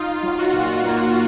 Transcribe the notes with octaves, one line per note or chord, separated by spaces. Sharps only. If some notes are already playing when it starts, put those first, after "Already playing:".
Already playing: D#4 F4
F#3
F#4
A#2
A#3